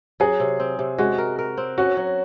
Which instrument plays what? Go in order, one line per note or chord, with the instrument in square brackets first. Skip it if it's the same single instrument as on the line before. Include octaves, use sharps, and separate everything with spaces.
[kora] F#3 [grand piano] G#4
[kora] C3
C4
C3
[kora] G#3 [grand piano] F#4
[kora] A#4
A#4
C4
[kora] C#4 [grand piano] F#4
[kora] F#3